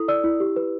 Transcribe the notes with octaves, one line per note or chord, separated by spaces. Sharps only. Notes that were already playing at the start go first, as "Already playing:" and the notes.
Already playing: E4 A4 D#6
D5 E6
E4
G4
B4